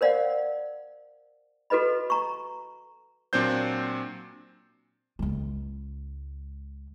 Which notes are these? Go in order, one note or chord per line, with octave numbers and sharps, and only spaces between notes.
A#4 C5 D5 F5 F#5
F#4 A4 B4 D#5 B5
A#5 C#6
A#2 F#3 C4 D4 C5 G6
C#2 G#3